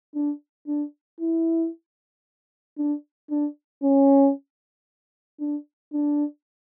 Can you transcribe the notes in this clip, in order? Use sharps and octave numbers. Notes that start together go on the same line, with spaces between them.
D4
D4
E4
D4
D4
C#4
D4
D4